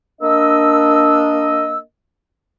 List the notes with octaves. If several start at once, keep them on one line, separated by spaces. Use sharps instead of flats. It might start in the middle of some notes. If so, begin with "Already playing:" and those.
A#3 D4 D#5 E6